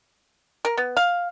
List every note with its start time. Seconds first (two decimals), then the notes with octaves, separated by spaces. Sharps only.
0.65 A#4
0.77 B3
0.97 F5